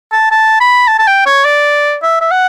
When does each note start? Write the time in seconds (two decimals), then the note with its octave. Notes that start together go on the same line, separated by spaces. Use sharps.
0.12 A5
0.31 A5
0.60 B5
0.88 A5
0.99 A5
1.07 G5
1.26 C#5
1.45 D5
2.03 E5
2.21 E5
2.31 F#5